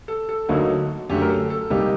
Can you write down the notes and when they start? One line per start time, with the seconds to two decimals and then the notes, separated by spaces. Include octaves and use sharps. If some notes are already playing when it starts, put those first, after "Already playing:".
0.08 A4
0.29 A4
0.49 D2 D3 F#3 A#3 D#4
1.10 F#2 D3 A3 G4
1.22 A#4
1.30 A4
1.50 A4
1.70 C2 C3 G3 A#3 D#4 G4